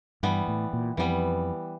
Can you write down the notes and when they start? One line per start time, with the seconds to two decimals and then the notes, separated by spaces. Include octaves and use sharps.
0.23 G2 E3 G3 B3
0.48 A2
0.73 A#2
0.97 F2 E3 G3 B3